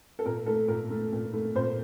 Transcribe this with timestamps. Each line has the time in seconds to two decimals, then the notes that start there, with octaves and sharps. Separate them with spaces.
0.19 A4
0.26 A#2 A#4
0.46 A3 A4
0.68 A#2 A#4
0.91 A3
1.13 A#2
1.33 A3
1.55 A#2 C5